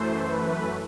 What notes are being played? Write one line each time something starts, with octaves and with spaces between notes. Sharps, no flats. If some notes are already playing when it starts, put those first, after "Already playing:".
Already playing: F#2 E3 A3 C5
B4